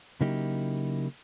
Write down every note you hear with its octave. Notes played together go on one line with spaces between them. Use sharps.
C#3 F#3 A#3 D#4 E4 G4